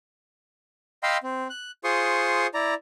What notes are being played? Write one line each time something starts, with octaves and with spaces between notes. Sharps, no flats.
D#5 F5 G5 B5 C6 E6
C4
F#6
F4 G#4 C5 C6 C#6 D#6
E4 D5 A#5